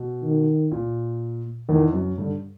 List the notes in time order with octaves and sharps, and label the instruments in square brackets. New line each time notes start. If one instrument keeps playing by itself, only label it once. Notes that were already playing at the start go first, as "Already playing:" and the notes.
Already playing: [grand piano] B2
[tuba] D#3
[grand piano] A#2
[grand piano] E2 [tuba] D#3
[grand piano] F#2
[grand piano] G2 [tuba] D3